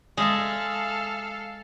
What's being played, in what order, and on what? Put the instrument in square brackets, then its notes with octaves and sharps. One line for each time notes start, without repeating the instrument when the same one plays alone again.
[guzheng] G#3 E5 A5 [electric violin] A4 F5